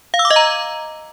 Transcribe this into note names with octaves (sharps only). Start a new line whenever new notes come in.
F5
E6
D6
D#5
A#5